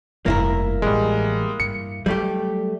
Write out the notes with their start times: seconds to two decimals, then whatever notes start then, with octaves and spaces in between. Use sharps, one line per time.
0.26 F1 G2 A#3 E4 A#4
0.82 A1 G3 G#3
1.60 G2 C#7
2.06 F#3 G3 A3 G4